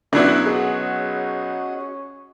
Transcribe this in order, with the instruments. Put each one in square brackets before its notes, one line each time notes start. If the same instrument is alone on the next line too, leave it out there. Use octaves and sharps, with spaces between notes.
[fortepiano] B1 F#3 B3 [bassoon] C#4 [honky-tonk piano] D4 E4
[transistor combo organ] F#4 D#5 [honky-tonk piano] G#4